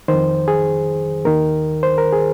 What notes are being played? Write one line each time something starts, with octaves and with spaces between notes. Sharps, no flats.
F2 D#3 C5
G#4
D#2 D#3 A#4
C5
A#4
G#4